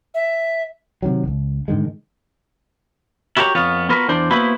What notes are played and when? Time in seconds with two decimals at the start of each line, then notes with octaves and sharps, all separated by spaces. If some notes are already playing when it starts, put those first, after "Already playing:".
0.14 E5
1.02 C3 D#3 F#3
1.24 D1 C#2
1.68 G#2 D3 D#3 G#3
3.37 E4 F#4 G4 A#4 C#5
3.55 F2 B3 F4 C#5
3.89 B3 F4 F#4 A#4 B4
4.09 E2 D4 C5 D5
4.31 A#3 B3 E4 F#4 B4 C5